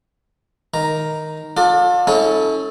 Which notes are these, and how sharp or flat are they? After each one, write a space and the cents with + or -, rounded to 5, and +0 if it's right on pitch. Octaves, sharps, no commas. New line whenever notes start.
D#3 +0 A#5 +0
F4 +40 A4 +30 D5 +20
C#4 -5 E4 -45 A4 +0